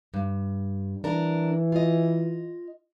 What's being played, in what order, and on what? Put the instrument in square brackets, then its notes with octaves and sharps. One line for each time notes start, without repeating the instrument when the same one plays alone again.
[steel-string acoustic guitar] G2
[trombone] E3 [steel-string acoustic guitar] D4 A#4
[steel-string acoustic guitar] F4 D#5